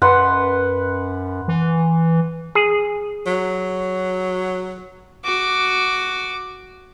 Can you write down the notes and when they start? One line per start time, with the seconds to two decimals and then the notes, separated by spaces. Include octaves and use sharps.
0.02 F#2 B4 F#5 C6
1.48 E3
2.55 G#4
3.26 F#3
5.24 F#4 D6